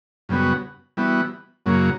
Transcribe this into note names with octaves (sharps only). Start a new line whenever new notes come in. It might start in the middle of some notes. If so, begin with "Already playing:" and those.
F#2 C#3 G3 B3 F#4
E3 G3 B3 F#4
F#2 C#3 F#3 A#3